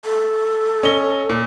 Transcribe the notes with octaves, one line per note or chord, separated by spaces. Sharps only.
A4
C#4 D#5 G7
A#2